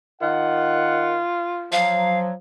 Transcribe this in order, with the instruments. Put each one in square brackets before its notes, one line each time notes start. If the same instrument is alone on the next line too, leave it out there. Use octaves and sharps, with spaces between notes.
[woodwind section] D#3 F#5 [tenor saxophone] F4
[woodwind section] F3 F#3 [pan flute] F5